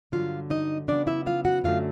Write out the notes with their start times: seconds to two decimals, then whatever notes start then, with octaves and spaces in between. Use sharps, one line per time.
0.12 G2 D3 F#3 F4 F5
0.50 D#4 D#5
0.88 C#3 F#3 B3 D4 D5
1.07 E4 E5
1.26 F4 F5
1.45 F#4 F#5
1.64 F#2 D3 F#3 A3 F4 F5